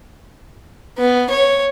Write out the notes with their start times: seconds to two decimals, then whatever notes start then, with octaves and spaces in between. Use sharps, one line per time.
0.98 B3
1.30 C#5